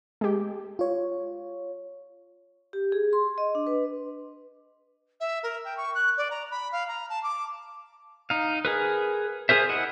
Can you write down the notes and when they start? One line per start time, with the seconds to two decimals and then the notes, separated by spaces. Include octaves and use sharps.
0.21 G#3 G4
0.79 F4 C#5
2.73 G4
2.92 G#4
3.13 C6
3.38 D#5
3.55 D4
3.67 B4
5.20 E5
5.43 A#4
5.65 G5
5.77 C#6
5.95 F#6
6.17 D5
6.30 A#5
6.51 B5
6.72 F5
6.88 A#5
7.09 A5
7.23 D6
8.30 D#4 F5
8.65 G#4 A#4 B4
9.49 G#4 A#4 C5 E5
9.69 E4 D#5 F#5